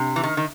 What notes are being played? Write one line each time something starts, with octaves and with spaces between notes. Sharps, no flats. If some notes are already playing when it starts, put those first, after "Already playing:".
Already playing: C3 D4
E3
D#3
D#3